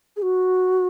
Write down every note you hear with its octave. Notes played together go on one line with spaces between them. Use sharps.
G#4
F#4